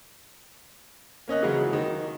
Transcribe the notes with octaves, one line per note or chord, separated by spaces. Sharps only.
A#3 C#4 D#5 F#6
C#3 E3 F#3 G#3
D#3